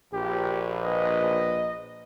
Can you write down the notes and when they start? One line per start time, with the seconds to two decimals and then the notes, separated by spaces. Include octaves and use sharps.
0.13 A#1 G4
0.84 B4 D#5